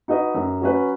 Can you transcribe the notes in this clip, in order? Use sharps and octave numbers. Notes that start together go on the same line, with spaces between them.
D#4 F#4 B4 D#5
F#2
F#3 C#4 B4